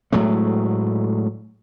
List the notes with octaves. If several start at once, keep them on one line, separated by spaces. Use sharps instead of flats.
A2 F#3 G#3 A3